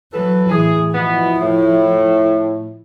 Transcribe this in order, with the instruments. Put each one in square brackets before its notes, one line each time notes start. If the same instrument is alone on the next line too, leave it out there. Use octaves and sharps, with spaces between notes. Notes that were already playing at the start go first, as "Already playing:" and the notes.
[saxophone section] E3 A4 B4 [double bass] F#3
[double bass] A2 E3 [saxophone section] G#4
[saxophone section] B2 B3 [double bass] F3 E4
[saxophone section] A2